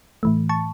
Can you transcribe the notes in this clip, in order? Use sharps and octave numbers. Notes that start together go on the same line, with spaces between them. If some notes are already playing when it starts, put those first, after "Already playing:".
A2 E3 A3
A5 C#6